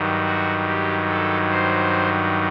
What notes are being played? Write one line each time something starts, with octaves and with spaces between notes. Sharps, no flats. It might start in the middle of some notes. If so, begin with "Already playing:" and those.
Already playing: G2 D#3 F#3
F#4
G4
A4
C5